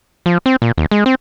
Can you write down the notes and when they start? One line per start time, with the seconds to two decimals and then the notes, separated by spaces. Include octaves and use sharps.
0.26 F3
0.46 C4
0.62 A#2
0.78 D#2
0.91 G#3
1.06 C4